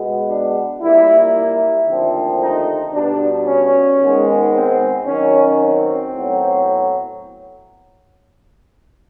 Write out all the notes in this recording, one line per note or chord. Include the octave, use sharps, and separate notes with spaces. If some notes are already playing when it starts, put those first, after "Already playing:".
Already playing: B2 G#3 B3
D4
A#2 G3 A#3 E4
E4
D#2 D3 F3 A3 C4
D#4
B2 G3 B3 D4
C#4
G#2 D#3 G#3 B3
C4
F#2 D#3 F#3 C#4
C4
A2 F#3 B3